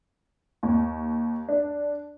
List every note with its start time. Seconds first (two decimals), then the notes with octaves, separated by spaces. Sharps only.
0.63 D#2
1.48 D4